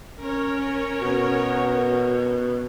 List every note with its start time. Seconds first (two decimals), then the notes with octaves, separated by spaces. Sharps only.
0.20 C#4 A#4 C#5
1.02 B2 F#4